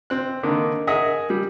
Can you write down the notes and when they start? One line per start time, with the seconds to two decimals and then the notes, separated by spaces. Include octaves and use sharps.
0.10 C4 F#6
0.43 D3 D#3 A#3
0.87 G#4 A#4 D#5 E5 F#5
1.30 G3